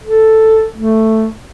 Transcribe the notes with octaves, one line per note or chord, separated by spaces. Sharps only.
A4
A3